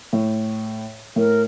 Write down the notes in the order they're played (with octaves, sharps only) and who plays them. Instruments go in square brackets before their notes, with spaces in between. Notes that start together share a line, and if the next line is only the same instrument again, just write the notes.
[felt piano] A2
[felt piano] A2 [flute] A#4